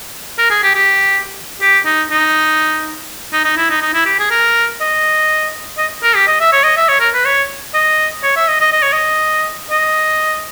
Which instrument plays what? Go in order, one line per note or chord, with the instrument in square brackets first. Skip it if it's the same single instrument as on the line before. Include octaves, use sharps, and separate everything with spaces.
[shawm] A#4
G#4
G4
G4
G4
D#4
D#4
D#4
D#4
E4
D#4
D#4
E4
G4
G#4
A#4
D#5
D#5
A#4
G4
D#5
E5
C#5
D#5
E5
C#5
A#4
B4
C#5
D#5
C#5
E5
D#5
D#5
D#5
C#5
D#5
D#5